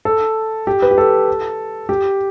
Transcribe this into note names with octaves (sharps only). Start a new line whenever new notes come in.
A4
G4
B4
G4
A4
G4